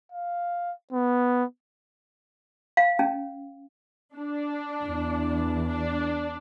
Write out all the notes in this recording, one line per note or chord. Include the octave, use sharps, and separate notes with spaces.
F5
B3
F5
C#4
D4
E2
D4